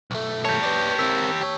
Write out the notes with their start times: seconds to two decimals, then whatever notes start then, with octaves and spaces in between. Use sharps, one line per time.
0.11 B1 A3
0.45 G4 C#5 A5 G6
0.63 B4 D5
0.99 C4 A#4 E6 B6
1.41 G4 C#5